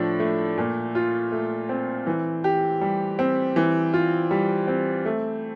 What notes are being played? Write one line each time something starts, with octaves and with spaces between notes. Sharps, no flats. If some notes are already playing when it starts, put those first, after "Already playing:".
Already playing: A2 F3 D4
A3
A#2
F4
A3
C4
E3
G4
G3
C4
E3
F4
G3
C4
A3